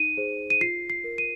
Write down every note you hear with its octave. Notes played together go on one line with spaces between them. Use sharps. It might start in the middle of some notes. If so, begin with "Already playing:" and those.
Already playing: D#4 D#7
G#4 C5
D#7
F4 C7
C7
A#4
D#7